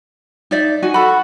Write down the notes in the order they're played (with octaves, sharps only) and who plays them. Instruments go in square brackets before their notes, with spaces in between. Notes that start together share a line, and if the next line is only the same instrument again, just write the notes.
[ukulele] D#4 D5 E5
D#4 F#4 G#5
[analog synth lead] F#4 [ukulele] A4 B5